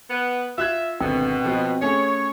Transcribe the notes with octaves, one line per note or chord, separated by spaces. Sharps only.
B3
F4 E5 F#6 G#6
G#1 B2 D3 C4
F3 B3 D#5
A3 C#4 G#4 C#5